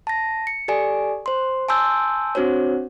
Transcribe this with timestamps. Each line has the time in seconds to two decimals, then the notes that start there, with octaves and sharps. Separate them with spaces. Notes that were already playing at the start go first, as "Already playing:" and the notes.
0.07 A5 A#6
0.47 C#7
0.68 G4 A4 D5 G#5
1.26 C5 C6
1.69 G#5 A5 C6 E6 G6
2.35 C4 D4 F#4 C5 C#5